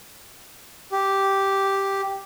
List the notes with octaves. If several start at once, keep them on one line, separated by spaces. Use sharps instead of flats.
G4